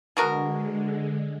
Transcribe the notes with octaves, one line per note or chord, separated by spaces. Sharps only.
B2 D3 G#3 F#4 A#4